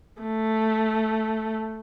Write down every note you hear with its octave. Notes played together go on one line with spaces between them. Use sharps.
A3